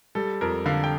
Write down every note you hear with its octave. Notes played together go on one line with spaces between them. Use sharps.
G3 A4
F2 A#4
D3 F5
G5